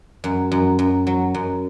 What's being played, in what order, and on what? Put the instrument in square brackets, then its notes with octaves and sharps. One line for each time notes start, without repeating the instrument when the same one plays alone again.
[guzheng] F#2
F#2
F#2
F#3
F#2